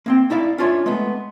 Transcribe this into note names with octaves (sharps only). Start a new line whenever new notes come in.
A#3 C4 G5
D#4 E4 D5 F5
C#4 D4 F4 C#5 E5
G#3 A3 B3